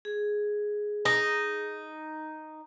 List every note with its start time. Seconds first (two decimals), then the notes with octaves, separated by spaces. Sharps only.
0.05 G#4
1.05 D#4